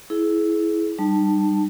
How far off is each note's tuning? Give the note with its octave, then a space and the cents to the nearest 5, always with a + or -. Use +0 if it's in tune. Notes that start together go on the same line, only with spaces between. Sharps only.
E4 -5 G#4 +25
G3 -5 D#4 -40 A5 +0